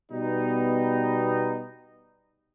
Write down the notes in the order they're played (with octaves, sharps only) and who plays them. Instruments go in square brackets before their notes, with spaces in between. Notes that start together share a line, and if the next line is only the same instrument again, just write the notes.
[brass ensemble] B2 G3 B3 D#4